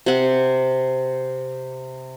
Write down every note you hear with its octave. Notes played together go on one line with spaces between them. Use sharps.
C3 F#5